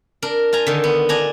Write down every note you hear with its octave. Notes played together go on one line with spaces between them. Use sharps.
D4 A#4
F4 G#5 A#5
D3 D#3
B3
D4 G#5 A#5